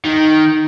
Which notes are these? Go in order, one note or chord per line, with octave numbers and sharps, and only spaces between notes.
D#3